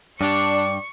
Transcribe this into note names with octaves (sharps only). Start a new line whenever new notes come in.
G2 D4 G4 D5 C#6